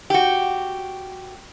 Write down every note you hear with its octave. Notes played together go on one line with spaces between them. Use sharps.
F#4 G4